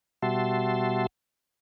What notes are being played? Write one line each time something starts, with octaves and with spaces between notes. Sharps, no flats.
B2 G3 F#4 E5 A5 C6